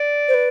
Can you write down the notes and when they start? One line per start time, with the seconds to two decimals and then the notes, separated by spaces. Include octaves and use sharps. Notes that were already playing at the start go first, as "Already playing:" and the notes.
Already playing: D5
0.28 C5
0.33 B4